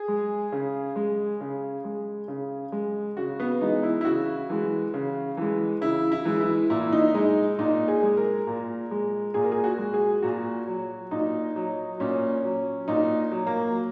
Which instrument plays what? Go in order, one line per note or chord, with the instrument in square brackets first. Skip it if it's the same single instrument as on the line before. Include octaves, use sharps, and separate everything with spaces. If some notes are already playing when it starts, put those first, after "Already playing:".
Already playing: [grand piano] G#4
G#3
C#3
G#3
C#3
G#3
C#3
G#3
C#3 F#4
B3
E3 G#3 D#4
E4
E4
C#3 F#4
E3 G#3
C#3
E3 G#3
C#3 E4
E4
E3 G#3
E4
A#2 E4
D#4
G#3 D#4
A#2 D#4
G#4
G#3
A#4
A#2
G#3
A#2 G#4
A#4
G#4
F#4
G#3
G#4
A#2 F#4
F#3
A#2 D#4
F#3
A#2 C#4
F#3
A#2 D#4
F#3
A#3